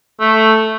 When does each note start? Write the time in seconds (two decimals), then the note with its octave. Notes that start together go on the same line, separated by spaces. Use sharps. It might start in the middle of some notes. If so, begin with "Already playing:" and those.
0.20 A3